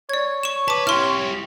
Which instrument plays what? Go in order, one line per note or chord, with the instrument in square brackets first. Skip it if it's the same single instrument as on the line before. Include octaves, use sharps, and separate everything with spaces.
[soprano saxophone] C#5 [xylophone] D5 G#6
[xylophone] C#6 E7
[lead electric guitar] B4 [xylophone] A5 D6
[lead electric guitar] E4 G4 [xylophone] C6 F6